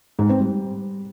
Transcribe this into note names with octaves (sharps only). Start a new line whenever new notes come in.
G#2
C4
G3